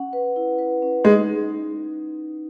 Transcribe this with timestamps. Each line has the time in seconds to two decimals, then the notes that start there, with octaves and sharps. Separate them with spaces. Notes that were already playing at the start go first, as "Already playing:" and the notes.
Already playing: C#4 F#5
0.13 B4
0.36 E4
0.59 B4
0.82 C#4
1.04 G#3 D#4